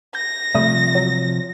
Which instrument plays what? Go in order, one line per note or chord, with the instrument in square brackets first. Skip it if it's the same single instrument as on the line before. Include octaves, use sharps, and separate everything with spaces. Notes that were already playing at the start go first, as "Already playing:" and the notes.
[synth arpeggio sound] G6 [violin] A#6
[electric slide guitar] C3 F3 [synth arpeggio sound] G3 A3 D#6
[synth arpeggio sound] F#3